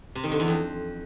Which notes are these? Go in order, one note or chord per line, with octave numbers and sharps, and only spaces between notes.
C3
D#3
D3
E2
F2